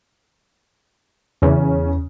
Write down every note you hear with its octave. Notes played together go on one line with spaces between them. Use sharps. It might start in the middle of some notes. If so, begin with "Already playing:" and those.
E2 C#3 C#4